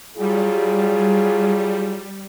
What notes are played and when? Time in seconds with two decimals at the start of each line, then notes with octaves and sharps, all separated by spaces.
0.18 F#3 G3 F4 G#4